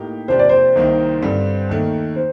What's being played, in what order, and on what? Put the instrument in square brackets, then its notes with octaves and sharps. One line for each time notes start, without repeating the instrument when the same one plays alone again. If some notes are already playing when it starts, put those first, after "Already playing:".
Already playing: [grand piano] A2 A#3 D#4 G4
[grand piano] C3 F3 A#3 D4 G4 [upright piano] C5
[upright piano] D5
C5
[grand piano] C2 C3 D#3 A#3 D#4
G2 D3 G3 C4
D#2 D#3 A3
[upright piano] C5